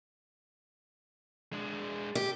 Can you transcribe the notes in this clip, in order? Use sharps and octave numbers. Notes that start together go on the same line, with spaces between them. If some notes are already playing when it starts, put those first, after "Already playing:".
G#3 D4
G4